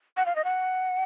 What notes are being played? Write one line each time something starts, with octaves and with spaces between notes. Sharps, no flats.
F#5
F5
D#5
F#5